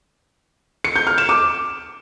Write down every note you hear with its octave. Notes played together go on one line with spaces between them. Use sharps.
C#7
G6
F6
E7
D6